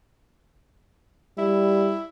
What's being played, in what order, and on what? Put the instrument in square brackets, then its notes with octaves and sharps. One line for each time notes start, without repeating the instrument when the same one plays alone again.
[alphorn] G3 [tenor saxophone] E4